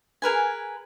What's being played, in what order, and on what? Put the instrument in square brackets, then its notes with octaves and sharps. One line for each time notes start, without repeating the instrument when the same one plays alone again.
[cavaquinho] G#4 A#4 B4 G#5